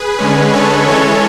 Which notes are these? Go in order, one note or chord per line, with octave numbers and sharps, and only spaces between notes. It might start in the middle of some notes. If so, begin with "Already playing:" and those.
Already playing: G#4 B4
D3 G#3 C#4
A4 C#5
E3 G#3 C#4 A4 C#5